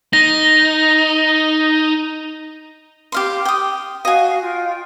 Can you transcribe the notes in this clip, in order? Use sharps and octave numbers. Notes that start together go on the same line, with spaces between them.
D#4 A#6
G4 F5 C6
G5 D#6
F#4 D#5 F5 G#5
F4 G5